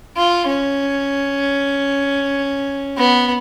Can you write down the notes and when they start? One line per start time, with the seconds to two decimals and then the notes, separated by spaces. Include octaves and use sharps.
0.17 F4
0.47 C#4
2.97 B3